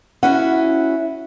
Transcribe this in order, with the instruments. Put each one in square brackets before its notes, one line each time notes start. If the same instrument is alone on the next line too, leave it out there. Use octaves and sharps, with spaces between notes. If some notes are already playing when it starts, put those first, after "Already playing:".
[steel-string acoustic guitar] C#4 E4 F#4 [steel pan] F#5